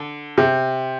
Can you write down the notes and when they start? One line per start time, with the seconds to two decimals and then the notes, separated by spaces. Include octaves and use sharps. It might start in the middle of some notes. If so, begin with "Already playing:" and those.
Already playing: D3
0.38 C3